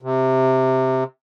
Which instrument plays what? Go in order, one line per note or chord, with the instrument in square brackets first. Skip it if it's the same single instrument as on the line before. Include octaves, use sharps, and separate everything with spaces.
[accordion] C3